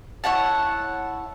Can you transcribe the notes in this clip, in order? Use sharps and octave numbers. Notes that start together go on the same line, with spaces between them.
E4 C#5 F#5 A5